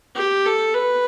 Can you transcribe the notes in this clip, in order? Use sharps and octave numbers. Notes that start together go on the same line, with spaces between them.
G4
A4
B4